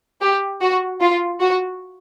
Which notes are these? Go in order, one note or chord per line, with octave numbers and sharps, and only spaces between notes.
G4
F#4
F4
F#4